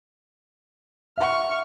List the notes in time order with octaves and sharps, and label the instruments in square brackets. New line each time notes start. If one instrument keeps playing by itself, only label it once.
[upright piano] E5 F#5 [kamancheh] C#6 F6